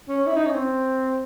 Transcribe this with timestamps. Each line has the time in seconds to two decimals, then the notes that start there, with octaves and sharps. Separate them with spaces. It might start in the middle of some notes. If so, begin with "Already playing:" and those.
0.09 C#4
0.27 E4
0.36 D#4
0.46 C#4
0.54 C4